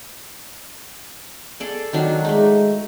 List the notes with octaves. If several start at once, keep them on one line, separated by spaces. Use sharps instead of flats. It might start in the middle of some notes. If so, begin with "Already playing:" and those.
G#4 A4 D5
D#3 F#3 D4
G#3 A3 D#4